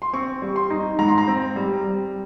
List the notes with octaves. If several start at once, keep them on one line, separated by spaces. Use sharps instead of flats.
C6
C4 C#6
G3
C6
D#4
G#2 A#5
C6
A#5
C4
G3
G3